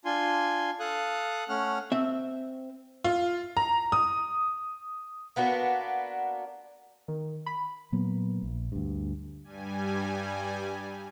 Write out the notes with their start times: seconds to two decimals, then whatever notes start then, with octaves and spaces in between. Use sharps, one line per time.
0.05 D4 F4 G#5 C6
0.80 A4 F5 D#6 F#6
1.49 A3 C#4 F#5 F6
1.92 C4 E5
3.04 F4
3.57 A#5
3.92 D#6
5.36 A#3 B3 D4 F#4
7.08 D#3
7.46 B5
7.92 A#2 F#3 A#3 B3
8.43 A#1
8.72 D2 G2
9.44 G2 G3 G#5